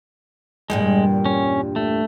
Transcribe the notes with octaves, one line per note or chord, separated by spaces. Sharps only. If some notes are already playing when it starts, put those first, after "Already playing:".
E2 G2 A#2 G#3
C#4
A3